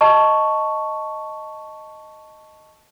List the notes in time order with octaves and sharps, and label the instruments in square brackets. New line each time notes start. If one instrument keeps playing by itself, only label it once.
[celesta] D#5 A5 C#6